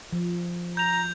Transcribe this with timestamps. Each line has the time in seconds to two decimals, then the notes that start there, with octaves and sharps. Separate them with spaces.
0.13 F3
0.77 A#5 G6 F7